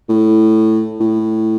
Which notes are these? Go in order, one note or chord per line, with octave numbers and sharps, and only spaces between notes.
A2
A2